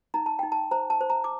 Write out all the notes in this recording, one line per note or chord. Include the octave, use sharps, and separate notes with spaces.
D#4 A#5
A5
D#4 G5
A5
C5 A#5
A5
C5
A#5
D6